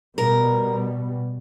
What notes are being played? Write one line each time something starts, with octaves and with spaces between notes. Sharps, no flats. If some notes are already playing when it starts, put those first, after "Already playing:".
B2 G3 B3 A#4